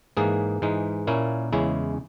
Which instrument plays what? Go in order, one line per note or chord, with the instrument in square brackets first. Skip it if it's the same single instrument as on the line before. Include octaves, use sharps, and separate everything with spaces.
[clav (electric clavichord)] G#2 E3 A#3 G#4
G#2 E3 G#3 D#4
A#2 A#3 C#4 E4
E2 C#3 G#3 C#4 E4